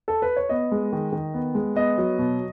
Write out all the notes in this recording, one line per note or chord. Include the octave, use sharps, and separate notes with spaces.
A4
B4
C#5
B3 D#5
G#3
D#3
D#3
B3
G#3
B3 D#5
F#3
B2